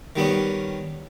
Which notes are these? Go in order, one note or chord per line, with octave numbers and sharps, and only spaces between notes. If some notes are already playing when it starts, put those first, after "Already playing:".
D#3 G3 B3 C#4